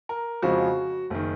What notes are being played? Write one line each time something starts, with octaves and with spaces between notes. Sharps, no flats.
A#4
F2 C#3 F3 G#3 F#4
F#1 D#3